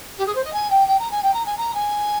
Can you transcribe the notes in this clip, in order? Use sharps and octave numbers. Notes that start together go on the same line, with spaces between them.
G4
G#4
C5
D#5
G#5
G5
G5
A#5
G#5
G5
A#5
G#5
A#5
G#5